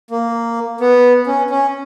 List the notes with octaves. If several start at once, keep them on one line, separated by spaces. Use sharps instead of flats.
A#3
B3
C#4
C#4